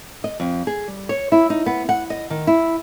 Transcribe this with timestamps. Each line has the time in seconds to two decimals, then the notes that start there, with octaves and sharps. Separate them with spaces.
0.24 D#5
0.40 F2
0.67 G#4
0.87 G3
1.09 C#5
1.32 E4
1.50 D#4
1.66 B3
1.89 F#5
2.10 D#5
2.30 D#3
2.47 E4